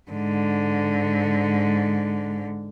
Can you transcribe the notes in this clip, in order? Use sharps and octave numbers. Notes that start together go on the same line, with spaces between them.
G#2 D3